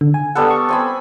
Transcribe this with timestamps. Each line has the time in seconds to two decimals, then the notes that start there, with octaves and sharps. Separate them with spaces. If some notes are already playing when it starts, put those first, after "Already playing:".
0.01 D3
0.14 G#5
0.35 G3 B3 A4 F#5
0.51 C#6
0.69 C4 G#5 B5